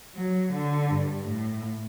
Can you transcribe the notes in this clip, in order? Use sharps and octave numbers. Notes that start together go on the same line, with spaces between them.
F#3
D3
G2
A2